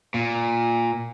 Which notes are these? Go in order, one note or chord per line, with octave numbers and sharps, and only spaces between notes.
A#2